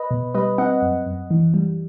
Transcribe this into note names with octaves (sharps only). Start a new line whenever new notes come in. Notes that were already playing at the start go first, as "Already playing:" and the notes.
Already playing: B4 D#5
B2
G3 B4 D#5
C4 D#5 F#5
F#2
F#2
E3
G3